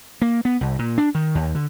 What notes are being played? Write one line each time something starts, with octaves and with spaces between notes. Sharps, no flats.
A#3
B3
C2
A#2
D4
D#3
D#2
D3